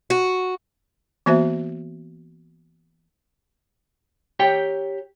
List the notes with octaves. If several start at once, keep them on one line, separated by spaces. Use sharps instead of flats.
F#4
E3 A#3 B3 F#4 C5 E5
G4 C#5 G5